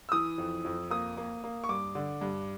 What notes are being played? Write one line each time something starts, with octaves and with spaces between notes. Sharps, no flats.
E6
E3 D#6
F2
F2
A#3 D#6
A#3
A#3
C#6
G2 D6
D3
G2